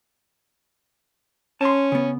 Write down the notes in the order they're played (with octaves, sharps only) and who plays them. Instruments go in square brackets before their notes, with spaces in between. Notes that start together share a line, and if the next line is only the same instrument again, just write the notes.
[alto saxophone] C#4 [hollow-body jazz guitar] A5 C6
[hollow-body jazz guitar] C#3 B3